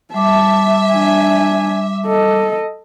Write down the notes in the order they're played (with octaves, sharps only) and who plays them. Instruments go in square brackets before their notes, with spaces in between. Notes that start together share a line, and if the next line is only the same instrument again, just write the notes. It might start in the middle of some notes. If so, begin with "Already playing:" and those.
[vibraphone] G3 D6 [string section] E5 [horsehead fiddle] A5
[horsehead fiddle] D4 G#5
A4 D#5